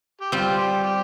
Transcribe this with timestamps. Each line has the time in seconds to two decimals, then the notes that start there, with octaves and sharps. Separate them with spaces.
0.21 G4
0.32 G3 C4 F4
0.58 G4
0.84 G4